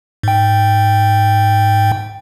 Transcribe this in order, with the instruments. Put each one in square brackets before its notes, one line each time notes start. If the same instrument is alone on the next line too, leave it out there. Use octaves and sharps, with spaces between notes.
[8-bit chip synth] G#2 G5